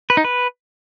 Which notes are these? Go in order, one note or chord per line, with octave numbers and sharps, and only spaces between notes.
B4
D#4
B4